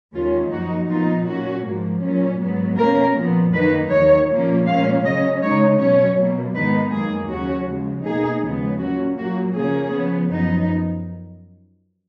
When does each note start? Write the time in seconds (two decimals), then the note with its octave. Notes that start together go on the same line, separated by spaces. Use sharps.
0.14 D#2 D#3 G#3 C#4 F4
0.52 F#2 F3 A#3 D#4 F#4
0.90 A#2 F3 B3 D#4 F4
1.27 A#2 F#3 C#4 F#4
1.65 G#2 F3 A#3
2.03 A#2 F#3 C#4
2.40 G#2 F#3 B3
2.78 B2 A#3 C#4 A#4
3.16 A#2 F3 B3
3.53 F#2 D#3 A#3 D#4 B4
3.91 D#2 D#3 F#3 C#5
4.29 A#2 F3 A#3 C#4
4.66 A#2 G#3 C#4 F5
5.04 C#3 F#3 C#4 D#5
5.41 C#3 G#3 D#4 C#5
5.79 B2 F#3 C#4 C#5
6.17 B2 F#3 A#3
6.55 G#2 D#3 G#3 B3 D#4 B4
6.92 F#2 D#3 A#3 G#4
7.29 D#2 C#3 F#3 C#4 F#4
7.68 C#3 F3 G#3
8.05 B2 A#3 D#4 G#4
8.43 D#2 C#3 F3 G#3 B3
8.80 A#2 F#3 C#4 F#4
9.18 A#2 F#3 A#3 F#4
9.56 C#3 F3 A#3 C#4 G#4
9.93 C#3 F3 B3
10.30 F#2 F3 B3 D#4